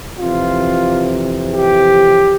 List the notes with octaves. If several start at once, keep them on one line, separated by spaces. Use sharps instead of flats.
F2 C3 E3 F4
G4